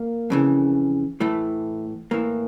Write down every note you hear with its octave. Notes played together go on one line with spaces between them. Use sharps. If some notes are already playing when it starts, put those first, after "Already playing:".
Already playing: A#3
F2 C#3 E3
A2 E3 A3
A2 E3 A#3